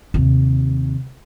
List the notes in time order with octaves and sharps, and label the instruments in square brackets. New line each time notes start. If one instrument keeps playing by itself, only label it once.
[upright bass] D#2 C3